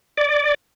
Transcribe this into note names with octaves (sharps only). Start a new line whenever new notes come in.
D5